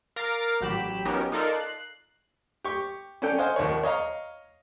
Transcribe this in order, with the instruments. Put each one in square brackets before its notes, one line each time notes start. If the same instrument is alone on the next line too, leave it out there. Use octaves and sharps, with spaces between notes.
[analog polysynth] A#4 F5 A#5 D6 F6 A6
A1 F#3 G4 B5 E7
F#3 B3 C#4 D#4 G4 A#4
D#4 F4 A4 A#4 D5
F#6 C7
[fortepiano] G4 C#6
C#4 D4 A4 G5
C5 D#5 F5 F#5 G#5 C6
A#1 D#2 A#3 C#5
C#5 D#5 F5 A#5